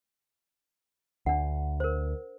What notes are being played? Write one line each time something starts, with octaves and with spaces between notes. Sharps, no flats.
D2 D4 F#5
A#4 C5